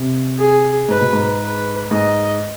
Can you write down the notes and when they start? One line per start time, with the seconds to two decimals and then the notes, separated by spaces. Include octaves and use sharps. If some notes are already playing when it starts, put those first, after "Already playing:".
Already playing: C3
0.38 G#4
0.89 G#2 B4
1.01 B2
1.13 G#2
1.41 B4
1.91 G#2 D#5